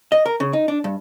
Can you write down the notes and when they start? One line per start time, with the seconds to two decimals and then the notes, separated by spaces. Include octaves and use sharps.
0.12 D#5
0.26 A#4
0.40 C#3
0.53 D#4
0.68 D4
0.84 G2